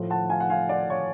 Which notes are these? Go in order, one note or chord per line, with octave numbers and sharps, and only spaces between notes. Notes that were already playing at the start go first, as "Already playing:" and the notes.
Already playing: A2 F3 A3
F#5 A5
F5 G#5
F#5
F5 G#5
D5 F#5
C#5 F5